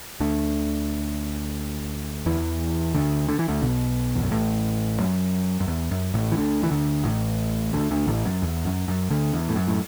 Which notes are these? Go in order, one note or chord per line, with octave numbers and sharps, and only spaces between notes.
D2 D3
E2 E3
D2 D3
D3
E3
D2 D3
B1 B2
E2
F#2
A1 A2
F#2
F#2
E2
F#2
A1 A2
E3
D2 D3
E3
D2 D3
A1 A2
D2 D3
D2 D3
A1 A2
F#2
E2
F#2
F#2
D2 D3
E2
A2
F#2
A2